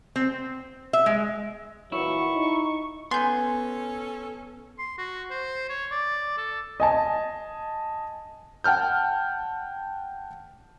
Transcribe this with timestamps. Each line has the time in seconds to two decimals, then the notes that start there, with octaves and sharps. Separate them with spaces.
0.16 C4
0.93 E5
1.06 G#3
1.92 A#2 E3 F#3 E4 C#6
2.35 D#4
3.11 B3 C#4 A4 G#5 C6 G6
4.79 C6
4.98 F#4
5.30 C5
5.69 C#5
5.91 D5
6.38 A4
6.80 D#5 G#5 A5
8.64 F#5 G5 A5 F6 G6